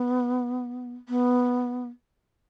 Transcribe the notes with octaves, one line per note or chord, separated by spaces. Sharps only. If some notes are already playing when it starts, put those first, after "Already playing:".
Already playing: B3
B3